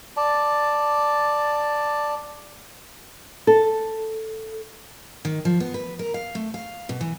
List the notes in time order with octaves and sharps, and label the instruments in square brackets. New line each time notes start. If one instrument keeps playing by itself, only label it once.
[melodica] D5 A5
[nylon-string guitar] A4
[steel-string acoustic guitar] D#3
F3
B3
B4
A#4
F5
A3
F5
B2
E3